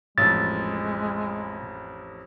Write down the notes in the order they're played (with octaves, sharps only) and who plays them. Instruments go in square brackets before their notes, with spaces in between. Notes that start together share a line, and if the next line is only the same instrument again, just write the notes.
[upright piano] A1 F2 [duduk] G#3 [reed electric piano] A6